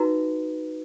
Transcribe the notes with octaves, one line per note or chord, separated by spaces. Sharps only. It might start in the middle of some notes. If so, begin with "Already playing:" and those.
Already playing: D#4 F#4 B4 A#5